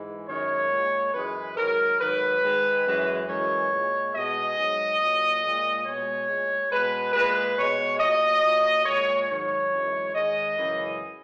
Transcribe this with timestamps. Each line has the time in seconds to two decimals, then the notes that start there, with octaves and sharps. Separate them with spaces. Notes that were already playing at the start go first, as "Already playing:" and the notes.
Already playing: G#2 E3 G#3
0.28 F#2 D#3 G#3 C#5
0.71 A#2 G#3
1.13 F#2 E3 G#3 B4
1.56 G#2 D#3 F#3 A#4
1.99 G#2 D#3 F#3 B4
2.42 G#2 D#3 G#3
2.86 F#2 E3 G#3
3.28 F#2 E3 G#3 C#5
3.71 A#2 G#3
4.14 B2 G#3 D#5
4.57 G#2 F#3
5.00 A#2 F#3
5.43 A#2 G#3
5.85 B2 G#3 C#5
6.28 A#2 G#3
6.71 B2 G#3 B4
7.13 A#2 G#3 B4
7.57 B2 G#3 C#5
7.99 A#2 F#3 D#5
8.42 A#2 F#3
8.85 A#2 G#3 C#5
9.28 G#2 D#3 F#3 C#5
9.70 F#2 E3 G#3
10.14 G#2 D#3 G#3 D#5
10.57 F#2 C#3 E3 G#3